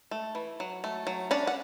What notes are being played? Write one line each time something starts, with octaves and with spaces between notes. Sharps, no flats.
A3
E3
F#3
A3
F#3
C#4 D4 D5
F#5